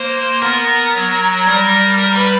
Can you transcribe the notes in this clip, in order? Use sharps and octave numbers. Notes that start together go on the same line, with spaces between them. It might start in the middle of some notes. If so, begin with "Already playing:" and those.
Already playing: A#3 C5
B3 A#4
F#3
G3 A#4
A#4
B4